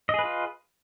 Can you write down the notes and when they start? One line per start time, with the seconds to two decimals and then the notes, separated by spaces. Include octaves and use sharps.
0.09 D#5
0.14 G#4
0.19 B4
0.24 F4